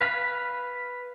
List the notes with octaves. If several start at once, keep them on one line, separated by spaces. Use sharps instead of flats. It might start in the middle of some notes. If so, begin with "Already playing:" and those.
B4 F5 B5